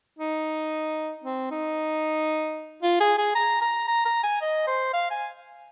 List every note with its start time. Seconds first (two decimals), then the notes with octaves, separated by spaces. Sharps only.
0.19 D#4
1.24 C4
1.51 D#4
2.82 F4
3.00 G#4
3.17 G#4
3.35 A#5
3.61 A#5
3.88 A#5
4.05 A#5
4.23 G#5
4.41 D#5
4.67 C5
4.93 F5
5.10 G#5